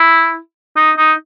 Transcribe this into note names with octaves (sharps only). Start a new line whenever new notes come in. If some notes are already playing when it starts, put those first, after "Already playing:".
Already playing: E4
D#4
D#4